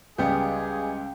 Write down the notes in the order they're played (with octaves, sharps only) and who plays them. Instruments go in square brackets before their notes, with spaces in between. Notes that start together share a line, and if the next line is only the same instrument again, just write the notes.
[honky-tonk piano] C#2 [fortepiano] G3 B3 [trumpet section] G#4 [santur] G5